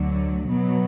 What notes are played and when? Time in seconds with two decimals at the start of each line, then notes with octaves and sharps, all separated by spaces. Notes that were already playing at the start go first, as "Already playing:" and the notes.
Already playing: D2 D3 F#3
0.49 B2 F#3 B3